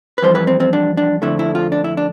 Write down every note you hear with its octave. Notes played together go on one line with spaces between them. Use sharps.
B4
F2 E3 G3 C5
B4
C4
C4
D4
D4
F2 D3 A3 E4
E4
F4
D4
E4
D4